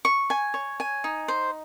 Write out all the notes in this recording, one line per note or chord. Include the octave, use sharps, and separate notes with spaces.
C#6
G#5
C#5
G#5
D#4
C5